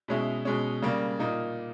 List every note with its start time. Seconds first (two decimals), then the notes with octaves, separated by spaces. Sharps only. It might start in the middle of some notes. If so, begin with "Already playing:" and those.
0.08 B2 G#3 C#4 E4
0.45 B2 G#3 C#4
0.82 C#3 G3 A#3
1.19 A#2 A#3 D#4